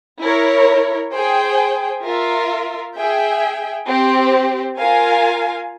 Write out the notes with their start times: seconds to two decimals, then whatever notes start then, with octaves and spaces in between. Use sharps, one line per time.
0.22 E4 A#4 C#5
1.13 G#4 C5 G5
2.05 F4 A#4 E5
2.97 G#4 E5 G5
3.88 C4 G4 C5
4.79 F4 A#4 F5 G#5